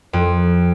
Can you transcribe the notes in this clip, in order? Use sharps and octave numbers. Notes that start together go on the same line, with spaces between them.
F2